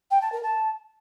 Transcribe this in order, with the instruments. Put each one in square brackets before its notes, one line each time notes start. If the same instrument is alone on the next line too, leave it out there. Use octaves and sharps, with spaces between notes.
[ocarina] G5
A5
A#4
A5